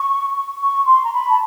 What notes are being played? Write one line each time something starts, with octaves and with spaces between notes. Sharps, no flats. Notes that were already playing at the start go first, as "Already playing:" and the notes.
Already playing: C#6
C#6
C6
A#5
B5
A5